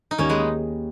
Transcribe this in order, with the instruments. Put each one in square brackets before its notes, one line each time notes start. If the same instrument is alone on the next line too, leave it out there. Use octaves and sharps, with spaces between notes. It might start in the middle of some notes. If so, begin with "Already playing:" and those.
[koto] D#4
[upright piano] D#2 [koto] A#3 C#4
[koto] G#3 B3